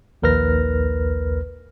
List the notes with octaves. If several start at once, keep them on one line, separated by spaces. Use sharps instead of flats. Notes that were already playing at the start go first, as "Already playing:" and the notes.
A#1 D#2 A#4 B4 F6 A#6